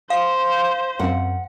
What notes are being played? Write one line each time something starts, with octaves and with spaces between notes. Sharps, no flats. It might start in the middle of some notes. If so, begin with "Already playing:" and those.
C5 F5
F#2 C4 F#5